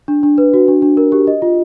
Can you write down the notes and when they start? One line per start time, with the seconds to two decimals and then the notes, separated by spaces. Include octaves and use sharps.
0.08 D4
0.23 D4
0.38 B4
0.54 F#4
0.68 D4
0.82 D4
0.97 A#4
1.12 G4
1.27 D#5
1.42 F4